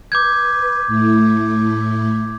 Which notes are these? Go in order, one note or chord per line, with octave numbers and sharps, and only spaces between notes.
B4 D6 G6 G#6
A2 A3 E4